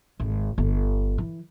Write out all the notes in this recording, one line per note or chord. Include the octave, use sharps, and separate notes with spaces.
G#1
G1
E3